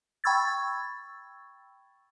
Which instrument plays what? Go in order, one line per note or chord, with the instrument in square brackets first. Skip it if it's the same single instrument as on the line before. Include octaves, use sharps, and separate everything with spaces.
[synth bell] G5 B5 C#6 E6 G#6 A6